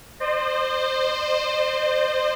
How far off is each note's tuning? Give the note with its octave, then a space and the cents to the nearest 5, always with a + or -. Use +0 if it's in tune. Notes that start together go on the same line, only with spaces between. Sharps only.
C5 +0 D#5 -45